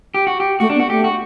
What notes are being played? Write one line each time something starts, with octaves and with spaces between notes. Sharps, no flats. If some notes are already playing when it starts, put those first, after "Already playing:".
G4
F#4
G4
A3 F#4
D4
B3
F#4
A3 G4
F#4